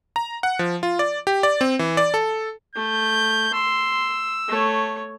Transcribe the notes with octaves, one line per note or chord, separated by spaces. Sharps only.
A#5
F#5
F3
F4
D5
G4
D5
C4
E3
D5
A4
A3 G6
C6 E6
A3 C#5